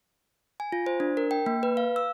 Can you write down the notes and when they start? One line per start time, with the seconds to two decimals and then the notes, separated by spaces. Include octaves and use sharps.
0.60 G#5
0.72 F4
0.86 C5
1.00 D4
1.17 A#4
1.31 G5
1.46 A#3
1.63 B4
1.77 F5
1.96 E6